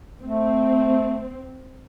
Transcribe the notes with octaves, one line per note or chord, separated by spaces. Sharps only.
A3 C4